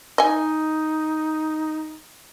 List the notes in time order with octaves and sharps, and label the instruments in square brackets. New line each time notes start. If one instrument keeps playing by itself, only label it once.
[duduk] D#4 [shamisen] D#5 G#5